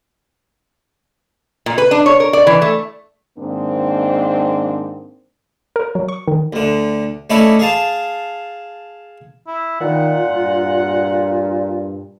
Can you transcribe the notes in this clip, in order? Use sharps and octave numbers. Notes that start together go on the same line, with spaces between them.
A#2
B4
D4
C#5
A#4
D5
E3
A3
G#2 D#3 A#3 C4 D4
A#4
F#3
C#6
D#3
D2 D3
A3 C#4 D#4 E4 A4 D5
G#4 F5 A5
E4
A#2 D#3 F4 F#5
G2